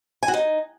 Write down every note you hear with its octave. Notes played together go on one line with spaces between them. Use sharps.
G#5
F#4
D#4